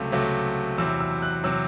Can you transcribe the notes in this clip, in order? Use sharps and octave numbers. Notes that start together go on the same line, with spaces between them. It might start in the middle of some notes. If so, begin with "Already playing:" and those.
Already playing: C#2 C3 F#3 A3
C#2 C3 F#3 A3
E2 C3 F#3 E6
E6
F#6
C3 F#3 E6